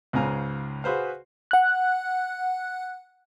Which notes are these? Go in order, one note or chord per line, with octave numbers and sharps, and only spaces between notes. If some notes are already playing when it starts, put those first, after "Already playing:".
C#2 G#2 C#3 F5 G#5 A#5
F#4 G#4 B4 C5 F5
F#5 F#6